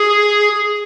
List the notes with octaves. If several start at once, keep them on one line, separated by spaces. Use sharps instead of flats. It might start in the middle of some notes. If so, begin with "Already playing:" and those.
Already playing: G#4